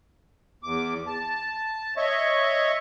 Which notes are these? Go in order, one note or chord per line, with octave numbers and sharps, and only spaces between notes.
E2 D6
A5
C#5 D#5 E5 C#6